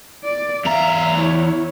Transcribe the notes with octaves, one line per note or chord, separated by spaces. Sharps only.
D5
E2 E5 F5 A#5
E4 C#5